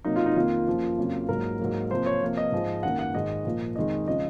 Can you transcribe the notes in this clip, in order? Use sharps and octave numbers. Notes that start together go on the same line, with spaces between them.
C3 F#3 A#3 D#4
F4
D#4
F2 D#3 A#3 F4
F#2 F3 A#3
F2 C#3 F#3 A#3
G#2 F#3 A#3 A#4
G#2 F#3 A#3
C3 F3 A#3 C5
C#5
C3 F3 A#3
D#5
G#2 F3 G#3
F#2 D#3 A#3 F#5
F#5
G#2 D#3 G#3 D#5
A#2 F3 A#3
F2 D#3 G#3 D#5
C#3 F3 G#3 D#5